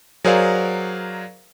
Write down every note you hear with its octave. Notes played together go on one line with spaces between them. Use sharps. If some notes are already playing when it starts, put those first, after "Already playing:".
F#3 G#4 A#4 C5 D5 F5